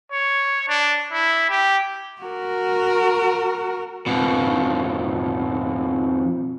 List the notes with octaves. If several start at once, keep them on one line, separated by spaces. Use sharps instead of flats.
C#5
D4
E4
G4
F#4 A#4
F2 B2